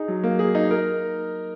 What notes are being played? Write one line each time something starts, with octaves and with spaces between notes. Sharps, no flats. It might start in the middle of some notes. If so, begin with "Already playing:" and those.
Already playing: D#4 G#4
F#3
A#3
G#4
D#4
A#4